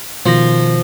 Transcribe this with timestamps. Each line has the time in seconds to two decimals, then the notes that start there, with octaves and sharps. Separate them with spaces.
0.26 B2 D#3 F3 A#6